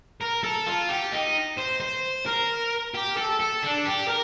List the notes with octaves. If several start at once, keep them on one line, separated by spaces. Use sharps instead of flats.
A#4
A4
F4
G4
D#4
C5
C5
A#4
G4
A4
A4
D4
G4
A#4